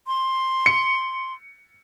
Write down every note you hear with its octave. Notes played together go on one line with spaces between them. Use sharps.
C6
C#7